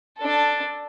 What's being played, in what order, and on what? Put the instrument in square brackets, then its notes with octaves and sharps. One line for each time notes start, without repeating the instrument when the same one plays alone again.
[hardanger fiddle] D4 A4